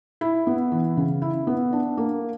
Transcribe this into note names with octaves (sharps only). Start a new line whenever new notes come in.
E4
B3
E3
C#3
E4
B3
D4
A#3